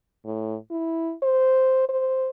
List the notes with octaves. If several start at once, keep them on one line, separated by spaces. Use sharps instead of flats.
A2
E4
C5
C5